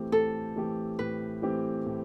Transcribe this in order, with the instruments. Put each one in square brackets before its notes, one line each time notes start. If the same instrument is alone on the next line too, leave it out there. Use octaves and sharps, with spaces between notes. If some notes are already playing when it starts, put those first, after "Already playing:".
Already playing: [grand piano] A2 E3 A3 C4 G4
[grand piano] A2 [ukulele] A4
[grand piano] E3 A3 C4 G4
[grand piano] A2 [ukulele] B4
[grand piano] E3 A3 C4 G4
A2